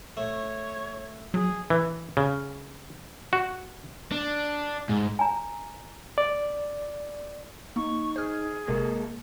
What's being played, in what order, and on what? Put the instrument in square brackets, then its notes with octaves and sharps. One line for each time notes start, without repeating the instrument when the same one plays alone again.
[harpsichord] A3 [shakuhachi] C#5
[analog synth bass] F#3 [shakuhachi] G#4
[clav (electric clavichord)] E3
C#3
F#4
[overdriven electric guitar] D4
G#2
[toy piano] G#5 A#5
[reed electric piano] D5
[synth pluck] A#3 [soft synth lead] D#4 [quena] C#6
[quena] G#4 [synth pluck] C5 F6
[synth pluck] G1 C3 [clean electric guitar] G#3 A#3 A4 [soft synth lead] A#4